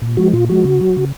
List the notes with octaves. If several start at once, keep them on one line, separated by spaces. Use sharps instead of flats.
A#2
F3 G#3 F#4
A#2 F4
F3 G#3 F#4
C#3
F#3
C#3